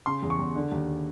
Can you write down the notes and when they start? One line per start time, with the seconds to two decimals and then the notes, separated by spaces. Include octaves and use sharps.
0.06 C#3 C6
0.23 E2
0.30 C#6
0.39 E2
0.55 D3
0.72 D#2